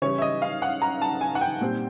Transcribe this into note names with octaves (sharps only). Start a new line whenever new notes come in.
C#3 E3 G3 C#5
E5
D#5
F5
F#5
A#5
A5
G#5
F#5
G5
A#2 G3 C4